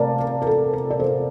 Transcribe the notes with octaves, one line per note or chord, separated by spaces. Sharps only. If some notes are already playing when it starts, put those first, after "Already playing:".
Already playing: C3 A3 C4 A#4 D5 F5 A5
A#4
A#4
A4
A#4
D5
A4 C5